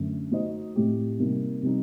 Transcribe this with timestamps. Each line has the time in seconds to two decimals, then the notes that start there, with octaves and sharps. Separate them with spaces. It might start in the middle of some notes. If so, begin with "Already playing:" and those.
Already playing: F#2 D3 A3
0.31 A3 D#4 F#4 C5 D#5
0.76 A2 A3 C4 G4
1.19 C3 G3 A#3 D#4
1.62 C3 G3 C4 D#4